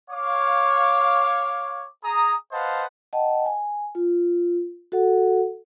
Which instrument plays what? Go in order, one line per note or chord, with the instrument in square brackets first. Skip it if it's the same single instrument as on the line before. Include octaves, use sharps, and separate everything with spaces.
[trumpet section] C#5 F5 D6
G#4 A#5 D#6
B4 C5 D#5 F5 F#5 A5
[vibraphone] D#5 F#5 G5 A5
G#5
F4
F#4 A4 F#5